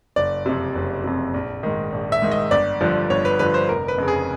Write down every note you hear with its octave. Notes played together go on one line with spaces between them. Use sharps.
F#1 D5
F2 C3
F#1
F2 C3
A#1
G#2 D#3
A#1
E5
G#2 D#3
D#5
G1 D5
G2 D3 F3
G1 C#5
B4
G2 D3 F3 B4
C5
F1 A#4
B4
F2 C#3
G#4